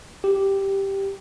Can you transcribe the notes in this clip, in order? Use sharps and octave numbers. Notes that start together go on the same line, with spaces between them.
G4